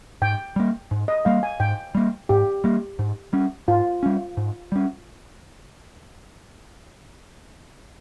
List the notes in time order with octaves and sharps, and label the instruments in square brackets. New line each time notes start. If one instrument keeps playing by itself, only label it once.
[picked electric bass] G#2 [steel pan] G5
[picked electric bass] G3 A#3
G#2
[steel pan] D#5
[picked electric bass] G3 A#3 [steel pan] F5
[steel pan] G#5
[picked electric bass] G#2 [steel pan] G5
[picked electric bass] G3 A#3
[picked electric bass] G#2 [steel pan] G4
[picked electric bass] G3 A#3
G#2
G3 C#4
[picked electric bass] G#2 [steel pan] F4
[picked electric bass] G3 C#4
G#2
G3 C#4